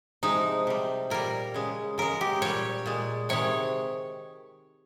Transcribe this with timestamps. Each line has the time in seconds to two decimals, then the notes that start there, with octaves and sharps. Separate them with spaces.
0.23 C3 F3 G#3 D#4
0.67 C3 G3
1.10 A#2 G3 A#4
1.54 C#3 G#3
1.98 C#3 G#3 A#4
2.21 G4
2.42 A#2 G3 C#5
2.86 A#2 G#3
3.29 C3 D#3 G#3 C#5